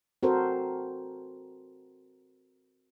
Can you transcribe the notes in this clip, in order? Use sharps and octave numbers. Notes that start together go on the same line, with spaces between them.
C4 F#4 A4 A#4 C5